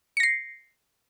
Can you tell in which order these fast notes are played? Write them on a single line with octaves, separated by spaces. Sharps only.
C#7 A#6 C7